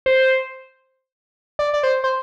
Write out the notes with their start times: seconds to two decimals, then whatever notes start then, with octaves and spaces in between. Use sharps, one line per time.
0.06 C5
1.59 D5
1.74 D5
1.83 C5
2.04 C5